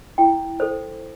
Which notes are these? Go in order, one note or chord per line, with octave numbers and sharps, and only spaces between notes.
E4 G5
A4 C5